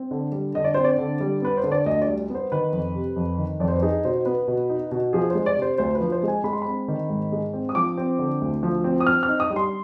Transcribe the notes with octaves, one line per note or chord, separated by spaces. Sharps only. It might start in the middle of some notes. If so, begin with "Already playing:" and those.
Already playing: C4
D3
G3
D3 D#5
D5
C4 C5
D5
D3
G3
B3 B4
C5
D3
D5
D2 D#5
D5
G3
B3
C5
D#3 B4
F2
C3
F2
D#3
F2 D5
C5
B4
D#4 G#4
B2 C5
B3 B4
B2
D#4
B2
F3 G#4
G#3 C5
D5
C3
C5
D2 C5
B4
F3
C5
G#3 G#5
G#3 B5
C6
C4 B5
D#3
G#2
G#3
C4
D#6
F3 D6
C4
D3
D2
F3
C4
D#6
C4 F6
F6
D#4
D#6
G3
C6